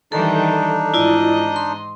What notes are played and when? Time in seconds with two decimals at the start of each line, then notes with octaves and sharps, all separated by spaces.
0.12 D#3 E3 G3 D4 D#4 A4
0.94 G#2 E4 F4 D5 D#5
1.56 C6